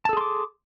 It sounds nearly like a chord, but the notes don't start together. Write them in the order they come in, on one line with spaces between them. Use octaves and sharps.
A5 A4 G#4 C6 D6